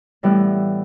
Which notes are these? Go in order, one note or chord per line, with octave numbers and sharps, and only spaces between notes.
A2 E3 G3 B3